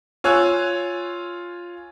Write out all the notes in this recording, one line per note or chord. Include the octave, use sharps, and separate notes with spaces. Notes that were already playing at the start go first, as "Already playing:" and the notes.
F4 C#5 G#5 E6 F#6